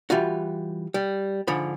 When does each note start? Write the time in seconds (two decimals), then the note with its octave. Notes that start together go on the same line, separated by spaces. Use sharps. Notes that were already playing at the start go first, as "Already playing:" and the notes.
0.10 E3 G3 F4 F#4
0.94 G3
1.47 G#2 D3 F3 B5